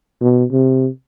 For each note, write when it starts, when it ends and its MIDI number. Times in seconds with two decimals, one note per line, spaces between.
0.21 0.44 47
0.52 0.88 48